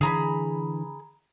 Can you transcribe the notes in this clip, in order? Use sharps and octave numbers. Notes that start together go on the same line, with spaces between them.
D3 E3 G#4 A#5 B5